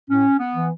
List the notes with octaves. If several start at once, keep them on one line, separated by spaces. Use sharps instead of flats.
A2 C#4
B3
E3